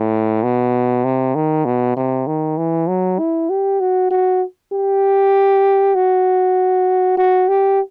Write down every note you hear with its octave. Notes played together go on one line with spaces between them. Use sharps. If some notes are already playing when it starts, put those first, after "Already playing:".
Already playing: A2
B2
C3
D#3
B2
C3
D#3
E3
F#3
E4
G4
F#4
F#4
G4
F#4
F#4
G4